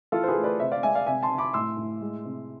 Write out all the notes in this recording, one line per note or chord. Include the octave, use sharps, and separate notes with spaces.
E3 F4 A4
C5
G#4 B4
A3
B4 D5
C3 C5 E5
D5 F5
G#3 E5 G#5
D5 F5
C3 E5 G#5
A5 C6
C3
B5 D6
A2 C6 E6
A2
G#3
C3